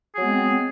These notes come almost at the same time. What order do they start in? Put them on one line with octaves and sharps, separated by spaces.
G#4 F#3 B3 G#3 C4